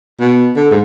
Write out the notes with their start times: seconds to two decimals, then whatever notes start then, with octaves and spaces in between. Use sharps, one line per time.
0.20 B2
0.56 D3
0.71 G#2